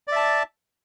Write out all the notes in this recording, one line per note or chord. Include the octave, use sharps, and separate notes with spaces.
D5 E5 A5